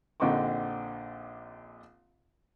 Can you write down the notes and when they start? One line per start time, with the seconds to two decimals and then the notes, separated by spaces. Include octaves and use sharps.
0.20 A#1 D3 C4 D#4 C#6 D6